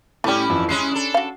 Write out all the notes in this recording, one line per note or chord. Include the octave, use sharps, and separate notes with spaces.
A2 G3 A3 C#4 E4 G4 D5
F2 E3
G#3 C#4 E4 C7
D4 A4
F#4 F5